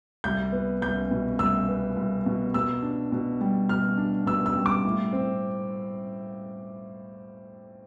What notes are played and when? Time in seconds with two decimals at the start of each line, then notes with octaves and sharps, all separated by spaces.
0.24 C2 G6
0.52 B3
0.82 C2 G6
1.11 B2
1.39 C2 E6
1.68 B3
1.96 C2
2.26 B2
2.54 B2 E6
2.82 D4
3.12 B2
3.41 G3
3.69 B2 F6
3.97 D4
4.26 B2 E6
4.46 E6
4.56 G3
4.66 D6
4.84 A2
5.13 C4